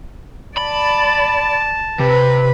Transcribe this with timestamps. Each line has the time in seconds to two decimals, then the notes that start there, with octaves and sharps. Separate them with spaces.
0.58 D5 A5 B5
2.00 C3 B4